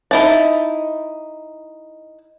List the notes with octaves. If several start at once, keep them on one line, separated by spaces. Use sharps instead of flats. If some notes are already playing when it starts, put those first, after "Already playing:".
D#4 E4 A5